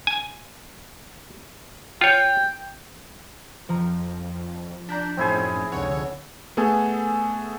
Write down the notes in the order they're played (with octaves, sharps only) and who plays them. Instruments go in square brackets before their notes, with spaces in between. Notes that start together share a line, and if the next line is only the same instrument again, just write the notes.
[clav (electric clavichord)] G#5
[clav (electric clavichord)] F4 C#5 [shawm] G5
[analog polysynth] F2 [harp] F3 A#5
[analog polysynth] D4 [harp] A#5 G6 B6
[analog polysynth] F#2 A2 C#4 [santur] C4 E4 G#4 [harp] D#4 G#5
[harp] F1 F#5 C#6 [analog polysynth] C#2 D3 C#5
[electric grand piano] A3 B3 G#4 A4 G#5